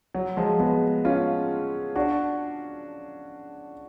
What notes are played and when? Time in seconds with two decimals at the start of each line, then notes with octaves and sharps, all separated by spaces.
0.15 F#3
0.37 F3 G#3
0.60 G#3 B3
1.05 C#4 F4
1.96 D4 F#4